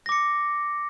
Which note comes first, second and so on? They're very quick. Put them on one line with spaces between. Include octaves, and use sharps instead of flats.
A#6 D6 C#7